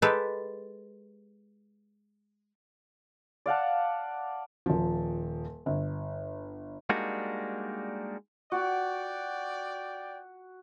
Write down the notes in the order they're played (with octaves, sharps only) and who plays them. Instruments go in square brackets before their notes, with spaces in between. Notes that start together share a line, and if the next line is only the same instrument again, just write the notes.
[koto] G#3 G4 A4 B4
[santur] D5 F5 F#5 A5
[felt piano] D#1 F3
G1
[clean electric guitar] G3 G#3 A#3 D4 D#4 F#4
[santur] F#4 [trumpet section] D5 G5